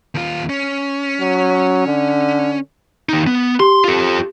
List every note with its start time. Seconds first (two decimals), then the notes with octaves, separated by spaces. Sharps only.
0.15 D#2 F4
0.49 C#4
1.20 F#3
1.87 D3
3.09 D#2 D#4
3.27 B3
3.60 G4 C6
3.84 F4 A4